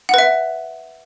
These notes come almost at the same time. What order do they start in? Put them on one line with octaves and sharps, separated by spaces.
F#5 B4 E5